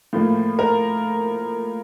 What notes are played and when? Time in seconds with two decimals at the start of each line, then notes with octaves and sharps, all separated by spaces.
0.13 A2 F3 A#3
0.59 A#4